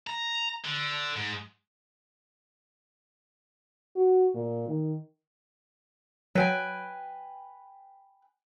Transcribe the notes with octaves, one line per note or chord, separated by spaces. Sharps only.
A#5
D3
G#2
F#4
A#2
D#3
F#3 B4 G5 G#5